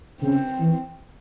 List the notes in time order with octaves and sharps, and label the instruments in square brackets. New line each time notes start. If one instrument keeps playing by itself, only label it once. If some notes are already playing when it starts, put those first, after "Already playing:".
[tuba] C#3 [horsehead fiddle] C4
[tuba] E3